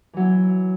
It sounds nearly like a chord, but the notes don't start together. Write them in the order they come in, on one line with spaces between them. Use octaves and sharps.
E3 F#3 E4